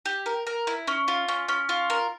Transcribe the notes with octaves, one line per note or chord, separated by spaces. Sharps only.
G4
A#4
A#4
E4
C#4
F4
C#4
C#4
F4
A#4